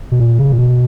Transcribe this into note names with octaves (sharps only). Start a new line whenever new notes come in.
B2
A#2
C#3
A#2
B2